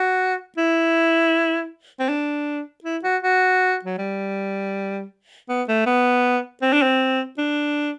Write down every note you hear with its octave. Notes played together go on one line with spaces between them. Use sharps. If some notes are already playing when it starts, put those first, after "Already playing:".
Already playing: F#4
E4
C4
D4
E4
F#4
F#4
F#3
G3
B3
A3
B3
C4
D4
C4
D4